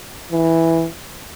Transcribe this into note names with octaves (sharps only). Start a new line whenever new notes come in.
E3